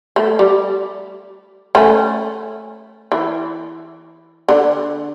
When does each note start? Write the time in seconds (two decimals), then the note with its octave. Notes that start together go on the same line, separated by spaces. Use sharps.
0.16 A3
0.39 G3
1.75 A3 C#4
3.12 E3
4.49 D3